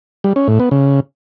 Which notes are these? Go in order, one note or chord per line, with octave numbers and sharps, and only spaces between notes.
G3
C#4
A2
B3
C#3